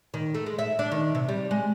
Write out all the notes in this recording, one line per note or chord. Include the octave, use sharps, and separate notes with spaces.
D#3
A3
G#3
E5
D4
D#3
C3
G3
G#3